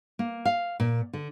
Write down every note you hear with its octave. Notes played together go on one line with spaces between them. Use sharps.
A#3
F5
A#2
D3